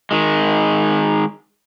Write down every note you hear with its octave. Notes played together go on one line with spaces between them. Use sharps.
D#3 G#3